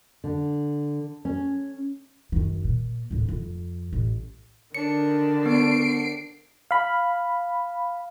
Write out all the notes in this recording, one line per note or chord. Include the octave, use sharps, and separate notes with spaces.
D3
C#4
F#2 D#3
A#2
D1 G#1
F2
A1
D3 D#3 D4 C#7
B3 C7 D7
F5 B5